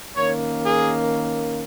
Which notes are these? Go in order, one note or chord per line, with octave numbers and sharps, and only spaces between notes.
D#3 A#3 C#4 C#5
G#4